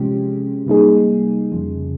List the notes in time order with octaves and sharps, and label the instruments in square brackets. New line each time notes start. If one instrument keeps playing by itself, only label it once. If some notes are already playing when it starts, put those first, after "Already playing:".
Already playing: [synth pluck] C3 F3 G#3 C#4 G4
C3 G3 A#3 D#4 G#4
F2 C#3 F3